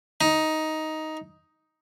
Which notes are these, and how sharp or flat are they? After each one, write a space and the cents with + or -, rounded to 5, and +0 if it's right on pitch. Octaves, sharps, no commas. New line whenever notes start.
D#4 +10